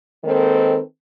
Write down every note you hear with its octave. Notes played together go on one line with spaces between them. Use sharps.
D#3 G#3 A#3 C4 A4 B4